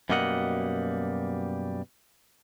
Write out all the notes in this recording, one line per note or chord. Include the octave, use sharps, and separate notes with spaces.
F#2 B2 G3 A#3 D#5 F#5